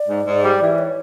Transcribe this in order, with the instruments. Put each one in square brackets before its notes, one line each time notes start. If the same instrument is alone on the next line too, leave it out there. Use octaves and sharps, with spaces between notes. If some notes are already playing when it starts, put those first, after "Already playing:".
Already playing: [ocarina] D5
[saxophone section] G#2
G#2
G3
E3
[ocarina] C#5